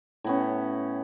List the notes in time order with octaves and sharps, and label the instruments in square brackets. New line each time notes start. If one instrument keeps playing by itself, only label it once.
[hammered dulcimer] A2 B3 C#4